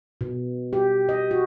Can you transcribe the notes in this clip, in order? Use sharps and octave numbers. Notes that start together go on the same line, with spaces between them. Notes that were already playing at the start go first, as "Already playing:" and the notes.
B2
G4
D#5
F#4